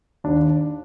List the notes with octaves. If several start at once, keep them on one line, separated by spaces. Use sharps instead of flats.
D#2 D4